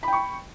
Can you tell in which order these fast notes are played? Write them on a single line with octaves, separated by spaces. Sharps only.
B5 G5 C#6